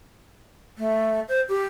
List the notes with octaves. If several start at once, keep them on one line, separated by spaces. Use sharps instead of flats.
A3
C5
G4